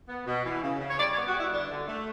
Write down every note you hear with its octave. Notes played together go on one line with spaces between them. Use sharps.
B3
B2
E3
C#3
C#3
C#5
G3 D5
C#5
B3
F#4
G3
E4
D3 D4
D3
A3